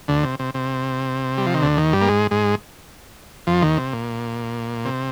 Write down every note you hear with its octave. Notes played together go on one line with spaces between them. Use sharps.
D2 D3
C3
C3
C3
G3
F3
D#3
D2 D3
D#2 D#3
G2 G3
A#3
G#2 G#3
G#2 G#3
F2 F3
D#2 D#3
C3
A#2
C3